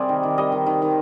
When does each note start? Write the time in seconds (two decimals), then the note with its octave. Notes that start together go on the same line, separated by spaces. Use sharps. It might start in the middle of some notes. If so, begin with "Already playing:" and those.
Already playing: C3 G3 C4 G#4 A#4 D5
0.09 D#3
0.23 D#3
0.38 G3 D#5
0.52 D#3
0.66 D#3
0.82 D#3